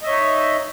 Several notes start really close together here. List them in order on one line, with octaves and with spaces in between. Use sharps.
D#5 E5 C#5 D#4